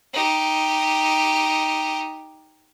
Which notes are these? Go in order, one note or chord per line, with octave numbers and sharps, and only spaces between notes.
D#4 G4